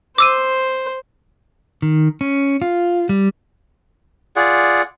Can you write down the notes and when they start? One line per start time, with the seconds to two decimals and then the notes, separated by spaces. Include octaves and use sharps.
0.18 C5 D6 E6 D#7
1.82 D#3
2.21 C#4
2.62 F4
3.09 G3
4.36 F4 G#4 D5 F#5